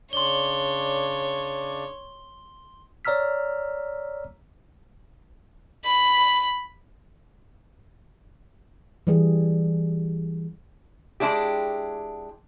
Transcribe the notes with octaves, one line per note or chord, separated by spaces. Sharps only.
C#3 D4 C#5 D5 C6 G7
C#5 D5 A#5 E6 F6 B6
B5
E3 G3 G#4
G#3 D4 E4 G4